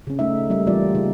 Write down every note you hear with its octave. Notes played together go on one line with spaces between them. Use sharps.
C#3 C#4
A3 C#4 D#4 E5
G3 A#3 D#4 E5
E3 G3 A#3 F4 G4 D5
C#3 D#4